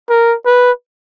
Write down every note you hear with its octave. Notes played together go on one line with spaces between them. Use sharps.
A#4
B4